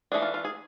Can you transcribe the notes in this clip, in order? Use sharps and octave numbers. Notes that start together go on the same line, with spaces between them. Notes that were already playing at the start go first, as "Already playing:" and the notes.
E3 A3 D4 G#4
F4
F4
G#4